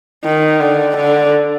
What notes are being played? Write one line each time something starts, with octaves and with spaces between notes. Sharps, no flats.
D#3
D3
D3